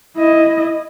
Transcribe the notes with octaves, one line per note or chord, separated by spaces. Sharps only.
E4 D#5